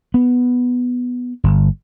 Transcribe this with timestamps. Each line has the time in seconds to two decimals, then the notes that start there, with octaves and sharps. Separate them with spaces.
0.14 B3
1.44 G1